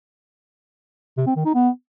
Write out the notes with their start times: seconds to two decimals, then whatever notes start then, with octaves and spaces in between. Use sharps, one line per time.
1.17 C3
1.27 C4
1.36 D#3
1.45 D#4
1.55 B3